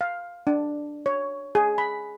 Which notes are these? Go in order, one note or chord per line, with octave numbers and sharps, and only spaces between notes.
F5
D4
C#5
G#4
B5